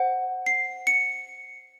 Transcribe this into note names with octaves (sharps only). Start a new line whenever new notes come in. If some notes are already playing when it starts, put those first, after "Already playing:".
Already playing: C5 F#5
C7
C#7